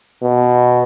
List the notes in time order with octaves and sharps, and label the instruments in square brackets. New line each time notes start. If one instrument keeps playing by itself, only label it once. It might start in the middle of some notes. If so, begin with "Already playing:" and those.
[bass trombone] B2